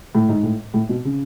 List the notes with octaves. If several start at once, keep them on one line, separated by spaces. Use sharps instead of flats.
A2
G#2
A2
A2
B2
C#3